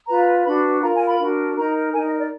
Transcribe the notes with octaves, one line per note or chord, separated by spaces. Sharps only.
F4 B4 A#5
D4 F#4 B4 B5
F4 A#4 A#5
G#5
B5
D4 F#4 A#4
D#4 A#4 A#5
D#4 A#4 G#5
D#5
D5